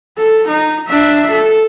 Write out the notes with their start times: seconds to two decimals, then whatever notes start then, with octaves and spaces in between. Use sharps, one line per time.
0.18 A4
0.48 D#4
0.88 D4 E5
1.31 A4